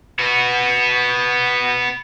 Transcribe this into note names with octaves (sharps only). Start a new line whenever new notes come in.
B3 F#4